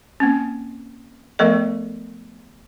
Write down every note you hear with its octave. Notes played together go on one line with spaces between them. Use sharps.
A#3 C4 C#4
F3 A3 B3 A4 A#4 D#5